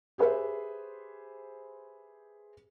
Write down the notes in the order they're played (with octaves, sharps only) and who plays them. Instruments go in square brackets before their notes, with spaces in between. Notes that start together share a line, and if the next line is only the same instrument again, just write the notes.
[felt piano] G4 G#4 B4 C5 E5